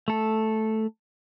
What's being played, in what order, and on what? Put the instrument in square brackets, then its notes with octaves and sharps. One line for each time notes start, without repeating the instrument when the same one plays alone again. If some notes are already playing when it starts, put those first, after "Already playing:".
[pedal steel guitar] A3 A4